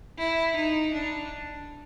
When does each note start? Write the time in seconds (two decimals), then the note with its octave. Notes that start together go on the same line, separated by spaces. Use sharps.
0.18 E4
0.55 D#4
0.93 D4